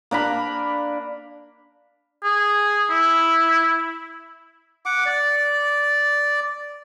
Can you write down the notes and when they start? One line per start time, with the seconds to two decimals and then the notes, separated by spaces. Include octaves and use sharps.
0.11 A#3 D4 A#5 B5
2.24 G#4
2.90 E4
4.86 F#5 D6
5.06 D5